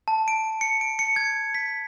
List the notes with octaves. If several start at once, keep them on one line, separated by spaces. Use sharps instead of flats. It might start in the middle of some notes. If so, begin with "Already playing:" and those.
A5
D7
C#7
D7
C#7
G#6
B6